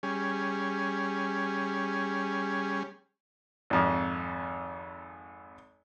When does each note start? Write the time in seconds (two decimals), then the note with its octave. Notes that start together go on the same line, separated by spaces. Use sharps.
0.03 G3 C#4 G#4
3.70 G#1 F2